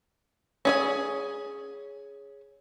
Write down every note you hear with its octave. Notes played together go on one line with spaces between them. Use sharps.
C#4 G#4 G#5